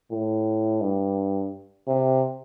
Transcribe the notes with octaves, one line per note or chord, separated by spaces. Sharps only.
A2
G2
C3